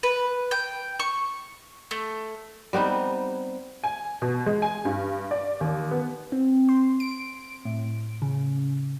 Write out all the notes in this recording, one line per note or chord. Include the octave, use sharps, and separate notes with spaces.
B4
G5
C#6
A3
G3 B3 C4 D#4
G#5
B2
G#3
G#5
G2
D5
D#2
B3
C4
C6
D7
A2
C#3